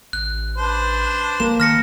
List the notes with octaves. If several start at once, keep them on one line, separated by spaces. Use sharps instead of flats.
A1 F#6
D4 B4 C5
G1 A#3 E7
D#3 F6 A#6 C#7